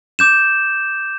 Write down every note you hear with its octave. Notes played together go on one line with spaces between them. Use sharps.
D6 G6 E7